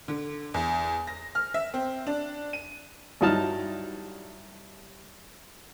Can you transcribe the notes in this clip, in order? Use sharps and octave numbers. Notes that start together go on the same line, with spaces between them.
D3
E2
A#6
F6
E5
C4
D4
D#7
G2 F#3 D#4 E4 A5 F6